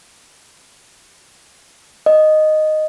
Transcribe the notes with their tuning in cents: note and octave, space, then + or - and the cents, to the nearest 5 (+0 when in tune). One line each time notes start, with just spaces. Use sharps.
D#5 -5